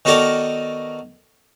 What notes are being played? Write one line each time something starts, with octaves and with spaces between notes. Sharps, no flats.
D#3 B3 F#4 A4 A#4 D5